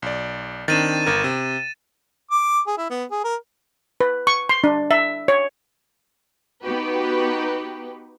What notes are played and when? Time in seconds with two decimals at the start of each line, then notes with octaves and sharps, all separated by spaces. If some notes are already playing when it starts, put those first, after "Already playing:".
0.02 B1 D5
0.68 D#3 C4 D4 A6 D#7 E7
1.06 G1 A#4
1.24 C3
2.31 D6
2.67 G#4
2.78 E4
2.90 B3
3.11 G#4
3.24 A#4
4.01 B4
4.27 C#6
4.49 C6
4.64 D4
4.91 E5
5.28 C#5
6.64 B3 D#4 F#4 G4 B4